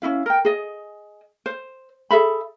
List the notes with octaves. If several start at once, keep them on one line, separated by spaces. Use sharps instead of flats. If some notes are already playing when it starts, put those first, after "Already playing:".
C#4 D#4 E4 F5
A#4 G5
G#4 D#5
C5
G#4 A4 E5 B5